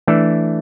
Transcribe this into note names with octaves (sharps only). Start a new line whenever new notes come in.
E3 A3 D4 A4